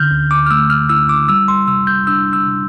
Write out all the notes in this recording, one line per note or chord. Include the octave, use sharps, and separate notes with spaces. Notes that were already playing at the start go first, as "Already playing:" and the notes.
Already playing: D3 F6 G6
D2
D6
F6
A3 E6
F6
E4 E6
D6
G3 E6
C6
C3 E6
G6
D4 E6
E6
C3